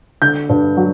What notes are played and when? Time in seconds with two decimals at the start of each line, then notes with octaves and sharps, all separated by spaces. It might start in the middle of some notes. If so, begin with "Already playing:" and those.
0.22 D3 G6
0.49 G2
0.77 F#3